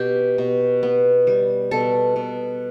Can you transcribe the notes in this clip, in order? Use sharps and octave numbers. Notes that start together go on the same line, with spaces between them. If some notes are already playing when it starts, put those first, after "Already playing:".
Already playing: B2 G4
B2
B3
G3
B2 A4
B2